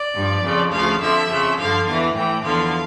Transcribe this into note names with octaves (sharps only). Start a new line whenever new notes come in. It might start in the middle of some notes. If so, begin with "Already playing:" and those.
Already playing: D5
G2 F3
F2 C#3 F3
D2 C#3 F3 F5
F2 D3 F3 E5
F2 C#3 F3
G2 D3 F3 F5
E2 E3 F5
A2 E3 G5
E2 D3 F3 F5